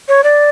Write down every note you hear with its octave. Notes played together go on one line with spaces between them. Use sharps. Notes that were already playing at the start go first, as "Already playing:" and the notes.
C#5
D5